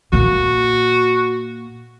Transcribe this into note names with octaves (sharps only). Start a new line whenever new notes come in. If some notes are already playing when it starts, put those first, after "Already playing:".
A#2 A#3 F#4